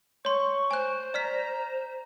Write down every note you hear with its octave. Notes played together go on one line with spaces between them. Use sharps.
C#5 C6 C#6
C5 G#5 F#6
D5 A#5 F6 B6